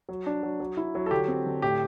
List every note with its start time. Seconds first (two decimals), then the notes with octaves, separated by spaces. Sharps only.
0.09 F#3
0.26 D4
0.43 F#3
0.60 F#3
0.77 E4
0.95 F#3
1.06 A4
1.11 D3 G4
1.28 C4
1.46 D3
1.62 A2 G4